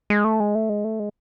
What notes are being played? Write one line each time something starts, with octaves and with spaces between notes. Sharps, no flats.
G#3
A3
G#3
A3
G#3
A3
G#3